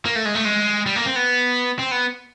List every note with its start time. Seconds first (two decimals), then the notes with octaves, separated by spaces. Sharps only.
0.05 A#3
0.16 A3
0.25 G#3
0.35 A3
0.45 G#3
0.86 G3
0.96 A#3
1.06 C4
1.16 B3
1.79 C4
1.91 B3